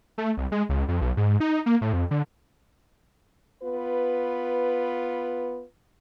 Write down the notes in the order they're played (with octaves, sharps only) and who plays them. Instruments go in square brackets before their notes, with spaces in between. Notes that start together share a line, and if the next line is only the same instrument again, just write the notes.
[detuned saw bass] A3
C2
G#3
C#2
F2
B1
G#2
D#4
A#3
A2
F2
D3
[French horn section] B3 F4 B4